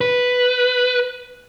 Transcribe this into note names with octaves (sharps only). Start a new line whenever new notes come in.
B4